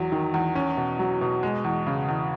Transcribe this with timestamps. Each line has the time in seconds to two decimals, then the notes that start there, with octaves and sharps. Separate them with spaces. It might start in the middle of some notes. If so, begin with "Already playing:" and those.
Already playing: E2 F#3
0.12 D#3
0.34 E2
0.55 C#4
0.77 B2
0.99 F#3
1.21 B2
1.43 G#3
1.65 E2
1.87 C#3
2.09 E2